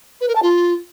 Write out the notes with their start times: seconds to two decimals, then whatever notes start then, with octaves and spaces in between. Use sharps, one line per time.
0.21 B4
0.28 A#4
0.35 A5
0.43 F4